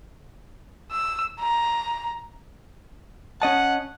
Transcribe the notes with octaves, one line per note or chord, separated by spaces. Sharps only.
E6
A#5
C#4 D#5 F#5 A5